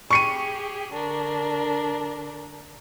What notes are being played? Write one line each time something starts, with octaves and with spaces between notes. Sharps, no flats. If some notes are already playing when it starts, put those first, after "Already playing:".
G4 G#4 C#6 C#7 D#7
D3 D4 A#4